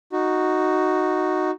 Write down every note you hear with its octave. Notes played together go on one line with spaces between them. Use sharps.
D#4 F#4